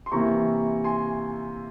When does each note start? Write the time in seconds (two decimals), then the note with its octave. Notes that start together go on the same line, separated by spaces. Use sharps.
0.06 C6
0.12 C3 E3 A#3 E4 A#5 C#6
0.84 G#5 C6